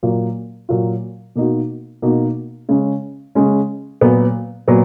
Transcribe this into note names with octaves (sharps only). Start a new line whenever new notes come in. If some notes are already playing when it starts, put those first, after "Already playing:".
A#2 F#3 A#3 F4
A#2 F#3 A#3 F4
B2 A#3 D#4 F#4
B2 A#3 D#4 F#4
C#3 G#3 C#4
C#3 G#3 C#4
A#2 F#3 B3
A#2 F#3 B3